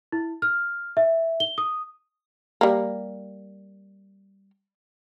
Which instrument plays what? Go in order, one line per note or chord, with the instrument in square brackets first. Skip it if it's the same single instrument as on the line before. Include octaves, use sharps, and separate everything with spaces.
[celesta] E4
F6
E5
G7
D#6
[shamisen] G3 A#3